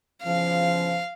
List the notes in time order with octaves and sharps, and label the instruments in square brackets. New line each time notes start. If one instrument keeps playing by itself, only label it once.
[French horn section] E2 C#3 F3 [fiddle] F5